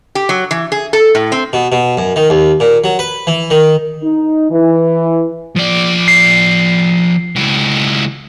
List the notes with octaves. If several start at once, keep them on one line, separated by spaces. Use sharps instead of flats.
G4
F#3
E3
G#4
A4
A2
C4
B2
B2
F#2
D#3
D#2
A#2
F#3
B4
E3
D#3
D#4
E3
F3 D5
C7
C#2 E4